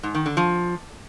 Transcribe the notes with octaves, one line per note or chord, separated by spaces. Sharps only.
G#2
D#3
D3
F3